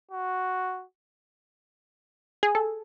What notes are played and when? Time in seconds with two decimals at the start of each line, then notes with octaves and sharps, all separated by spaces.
0.11 F#4
2.43 G#4
2.55 A4